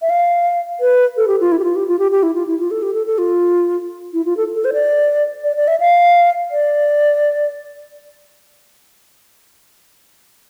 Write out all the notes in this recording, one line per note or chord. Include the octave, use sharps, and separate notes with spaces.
E5
F5
B4
A4
G4
F4
E4
G4
F4
G4
F4
G4
G4
E4
F4
E4
F4
A4
G4
A4
A4
F4
E4
F4
A4
A4
C5
D5
D5
D5
E5
F5
D5